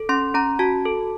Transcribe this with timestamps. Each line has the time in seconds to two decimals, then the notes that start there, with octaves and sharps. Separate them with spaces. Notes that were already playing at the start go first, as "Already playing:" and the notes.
Already playing: A4
0.09 C#4 C6
0.34 C#4 A#5
0.59 F#4 A5
0.85 A4